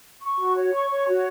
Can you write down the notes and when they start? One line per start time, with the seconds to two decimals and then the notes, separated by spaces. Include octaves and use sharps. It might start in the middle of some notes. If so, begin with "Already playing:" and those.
0.22 C#6
0.39 F#4
0.57 C#5
0.73 C#6
0.90 C#5
1.08 F#4